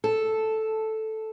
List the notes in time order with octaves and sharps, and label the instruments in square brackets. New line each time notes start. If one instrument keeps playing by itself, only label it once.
[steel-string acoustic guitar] A4